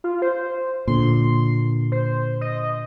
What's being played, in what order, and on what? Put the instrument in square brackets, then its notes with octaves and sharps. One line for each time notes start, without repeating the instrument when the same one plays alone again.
[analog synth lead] F4
C5
[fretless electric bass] A#2 D3 [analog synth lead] C6
[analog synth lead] C5
D#5